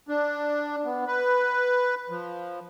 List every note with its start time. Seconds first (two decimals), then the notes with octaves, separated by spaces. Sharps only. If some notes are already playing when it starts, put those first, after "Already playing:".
0.08 D4
0.85 B3
1.07 B4
2.10 F3